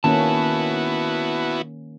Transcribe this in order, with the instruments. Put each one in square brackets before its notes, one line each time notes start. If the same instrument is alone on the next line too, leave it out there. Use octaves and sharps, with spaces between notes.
[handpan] D#3 A#3 C#4 [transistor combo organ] B3 E4 F#4 [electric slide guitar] A5